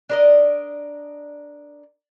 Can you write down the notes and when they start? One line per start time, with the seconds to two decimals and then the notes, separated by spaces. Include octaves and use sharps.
0.09 D4 A#4 D#5